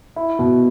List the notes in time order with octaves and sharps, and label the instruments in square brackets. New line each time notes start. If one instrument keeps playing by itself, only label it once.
[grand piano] E4
B2